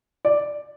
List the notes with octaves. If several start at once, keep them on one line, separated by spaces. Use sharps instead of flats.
D5